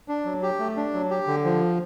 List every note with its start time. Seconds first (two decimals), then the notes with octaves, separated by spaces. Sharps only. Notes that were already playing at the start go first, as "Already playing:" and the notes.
0.08 D4
0.25 F#3
0.42 G4
0.59 A3
0.76 D4
0.93 F#3
1.10 G4
1.27 D3
1.45 F3